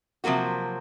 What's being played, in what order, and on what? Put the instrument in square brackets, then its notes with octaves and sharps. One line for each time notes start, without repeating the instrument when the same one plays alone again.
[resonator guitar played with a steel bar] C3 F3 F#3 A#3 F#4